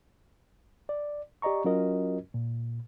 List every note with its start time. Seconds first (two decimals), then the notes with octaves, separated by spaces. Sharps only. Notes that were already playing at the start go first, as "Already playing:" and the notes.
0.89 D5
1.42 G4 D5 D#5 A#5 C#6
1.64 F#3 C#4 F4 F#4 A#4 D#5
2.34 A#2